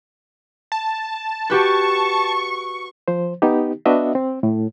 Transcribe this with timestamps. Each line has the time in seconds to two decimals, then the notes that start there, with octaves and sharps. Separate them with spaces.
0.72 A5
1.50 F#4 G4 B4 C#6
3.08 F3 C5
3.42 B3 D#4 G4
3.86 B3 D4 F#4 D#5 E5
4.15 C4
4.43 A2